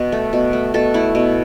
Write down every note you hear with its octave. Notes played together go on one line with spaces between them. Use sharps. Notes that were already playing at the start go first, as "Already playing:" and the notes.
Already playing: B2
A3
B2
A3
B2 A4
A3 E4
B2